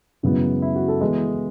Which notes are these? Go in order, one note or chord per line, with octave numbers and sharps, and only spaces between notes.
F#2 C#3 E3 G#3 B3 F#4
E4
F#4
A4
E3 G#3 B3 D#5